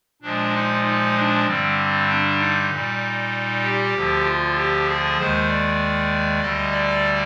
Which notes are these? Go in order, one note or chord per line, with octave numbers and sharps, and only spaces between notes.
A#2 F3 G#3 D4
D#4
D#4
D4
G2 D3 G3 C4
D4
D#4
A#2 G3
G4
D2 D3 F3
F4
G4
G#4
D#2 D#3 G#3 C5
D5
D2 D3 G3 D#5
D5